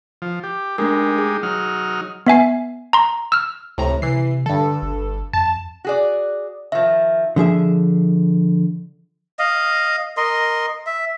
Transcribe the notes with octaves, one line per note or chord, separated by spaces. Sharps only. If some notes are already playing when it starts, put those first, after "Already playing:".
F3
G4
G#3 A3 D4 D#4 G4 A#4
G#4
F#3 D#4 F6
B3 E5 G#5 C7
A#5 C6
E6 F6
C#2 A2 C3 A#5
C3 E3 C7
G2 D3 A4
G1
F2 A5
F#4 G#4 D5
D#3 F3 E5
D3 F3 G#4 E5
D#5 F5
A#4 D#5 C6
E5